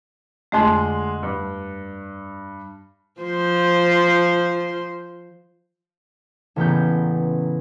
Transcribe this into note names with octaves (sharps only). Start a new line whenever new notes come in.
F2 D3 G#3 A3 C6
G2
F3 C5
A1 C#3 B3 G4 A#5 G6